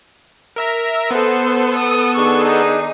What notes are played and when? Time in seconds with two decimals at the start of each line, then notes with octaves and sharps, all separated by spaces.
0.56 A#4 E5 A#5
1.11 B3 A4 C5
1.79 D#6
2.16 D#3 D4 G#4 C#6
2.45 D#4